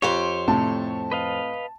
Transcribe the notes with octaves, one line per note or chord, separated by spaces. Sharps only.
F2 G4 C5 C#5
A2 C3 A5
B4 D#5 F5